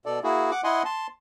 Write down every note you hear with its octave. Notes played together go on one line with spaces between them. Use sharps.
B2 A4 D5
A#3 E4 F#4 G#4
F#5 D6
E4 D#5 F#5 G#5 C6
A5 C6